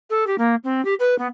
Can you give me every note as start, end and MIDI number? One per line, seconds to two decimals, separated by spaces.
0.10 0.27 69
0.27 0.36 67
0.38 0.55 58
0.64 0.84 60
0.85 0.94 67
1.00 1.17 71
1.18 1.27 59